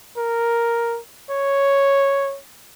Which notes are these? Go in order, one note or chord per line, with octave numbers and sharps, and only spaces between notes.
A#4
C#5